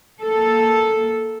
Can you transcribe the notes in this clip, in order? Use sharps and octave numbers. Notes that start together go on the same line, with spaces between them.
A#3 A4